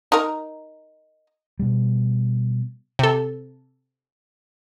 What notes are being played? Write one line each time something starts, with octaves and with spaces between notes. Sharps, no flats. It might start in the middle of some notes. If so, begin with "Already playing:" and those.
D#4 A#4
B2 G3
C3 A4